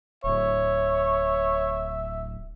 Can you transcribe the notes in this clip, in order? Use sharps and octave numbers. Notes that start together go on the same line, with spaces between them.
D1 C#5 E5